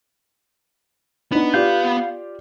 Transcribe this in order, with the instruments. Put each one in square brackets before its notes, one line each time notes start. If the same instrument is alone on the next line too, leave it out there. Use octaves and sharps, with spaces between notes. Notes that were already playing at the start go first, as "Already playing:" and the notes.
[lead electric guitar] B3 B4 [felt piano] D4 D#4
[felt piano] F4 G4 D5 [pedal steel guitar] F5 G6